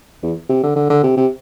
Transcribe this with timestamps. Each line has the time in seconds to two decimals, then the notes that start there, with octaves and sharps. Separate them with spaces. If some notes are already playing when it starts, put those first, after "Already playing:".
0.23 E2
0.49 C3
0.63 D3
0.76 D3
0.90 D3
1.03 C3
1.17 C3